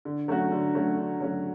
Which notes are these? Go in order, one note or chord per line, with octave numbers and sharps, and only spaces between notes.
D3
F#3 A3 C#4 F#4
D3
F#3 A3 C#4 F#4
D3
F#3 A3 C#4 F#4